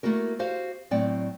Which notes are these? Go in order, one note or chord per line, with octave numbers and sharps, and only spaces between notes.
A3 A#3 E4 F#4 A#4
F#4 G4 C5 F5
A2 F#3 C4 D5 F#5 G5